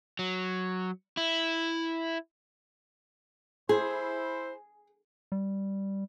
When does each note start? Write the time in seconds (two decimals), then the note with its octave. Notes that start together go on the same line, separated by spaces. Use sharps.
0.19 F#3
1.17 E4
3.69 E4 G#4 C5
5.32 G3